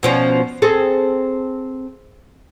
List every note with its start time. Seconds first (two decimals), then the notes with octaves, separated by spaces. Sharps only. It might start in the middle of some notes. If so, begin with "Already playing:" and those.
0.03 B2 F3 C#4
0.62 C4 G#4 A4